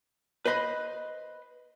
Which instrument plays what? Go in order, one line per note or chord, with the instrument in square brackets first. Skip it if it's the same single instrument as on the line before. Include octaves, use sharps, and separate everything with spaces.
[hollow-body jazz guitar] B4 C5 D#5 B5